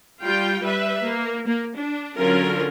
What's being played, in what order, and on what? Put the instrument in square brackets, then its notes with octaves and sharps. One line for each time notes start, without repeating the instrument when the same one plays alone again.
[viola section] G3 F4 G5
G3 B4 E5
A#3
A#3
D4
D3 F#3 C#4 F4 A#4